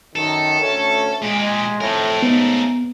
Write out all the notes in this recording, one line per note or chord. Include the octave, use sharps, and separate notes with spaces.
F#2 D#3 A4
D2 A3 C#4
A#2 G#3 G4
F2 A2 A3 A#4
G#2 C#3 B3 D#4